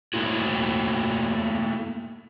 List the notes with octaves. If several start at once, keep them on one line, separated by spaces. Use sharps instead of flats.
A3 A#3 E4 F#4